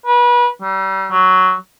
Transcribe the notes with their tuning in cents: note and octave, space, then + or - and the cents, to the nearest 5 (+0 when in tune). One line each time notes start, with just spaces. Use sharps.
B4 -30
G3 -35
F#3 +5